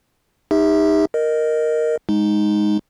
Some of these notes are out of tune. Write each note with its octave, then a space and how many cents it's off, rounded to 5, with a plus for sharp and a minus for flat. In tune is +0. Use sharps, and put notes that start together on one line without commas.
D#4 +0 G4 +40 E5 -25
A#4 +0 D#5 -10
G#3 +0 D#4 +0